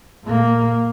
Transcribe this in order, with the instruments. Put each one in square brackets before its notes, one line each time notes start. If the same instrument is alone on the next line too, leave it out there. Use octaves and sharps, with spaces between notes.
[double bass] A#2 A#3